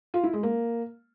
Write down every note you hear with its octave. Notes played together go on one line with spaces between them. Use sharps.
F4
E4
G#3
A#3